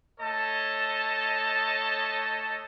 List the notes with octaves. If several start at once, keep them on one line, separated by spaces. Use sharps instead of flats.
A3 A4 C#5 D#5 A5